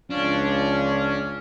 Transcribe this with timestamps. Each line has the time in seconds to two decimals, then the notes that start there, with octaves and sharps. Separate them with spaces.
0.11 C#2 F3 C#4 D4